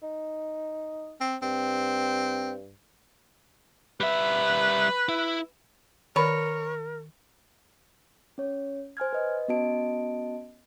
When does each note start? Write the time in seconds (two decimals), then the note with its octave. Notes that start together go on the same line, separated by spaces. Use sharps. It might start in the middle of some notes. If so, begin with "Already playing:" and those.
0.03 D#4
1.21 C4
1.42 G2 C4
4.00 G3 B4 E5
5.09 E4
6.16 D#3 A#4 C#5 B5
8.38 C#4 C#5
8.97 C5 G#5 F6 G#6
9.13 B4 D#5
9.48 B3 C#4 F#4 D#5 A5 D7